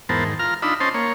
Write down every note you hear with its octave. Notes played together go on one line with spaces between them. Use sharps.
E2 G#2 B3 A#4 C5 A5
G#2 D#3
F4 A#5 F6
D4 D#4 F4 B5 E6
C#4 C5 D#5 A5 C6
A#3 C#5